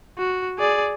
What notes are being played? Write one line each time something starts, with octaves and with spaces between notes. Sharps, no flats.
F#4
G#4 D5